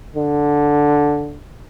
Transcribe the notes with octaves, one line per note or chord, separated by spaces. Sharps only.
D3